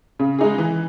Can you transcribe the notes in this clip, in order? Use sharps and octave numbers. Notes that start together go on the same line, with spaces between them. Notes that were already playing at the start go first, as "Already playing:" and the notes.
C#3
G#3 D#4 G#4
E3